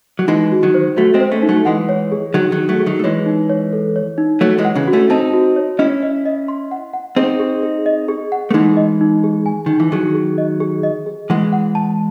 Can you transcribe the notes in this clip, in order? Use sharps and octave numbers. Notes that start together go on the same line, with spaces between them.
F#3
E3 G#3 D#4
F#4
D#3 F#3
C5
F#3 A3 F#4
G#3 C4
C5
A3 C#4
D#4
F#3 A3
E3 G#3 F#5
C#5
G#4
D#3 F#3 G#4
D#3 F#3
G#4
F#3 A3
G#4
D#3 F#3
A3
E3 G#3 C#5
D#4
C#5
A4
C#5
D#4
F#3 A3 C#5
E3 G#3
F#5
C#3 E3
F#4
A3 C#4
C4 D#4 A5
F#4
C#5
C#4 E4 D#5
D#5
D#5
C6
F#5
F#5
C4 D#4 G#4
G#4
G#4
D#5
G#4
F#5
A3
E3 G#3 D#4
D#5
D#4
G#4
G#5
D#3 D#4
E3
D#3 F#3 G#4
G#4
D#5
G#4
D#5
G#4
E3 G#3 F#5
F#5
A5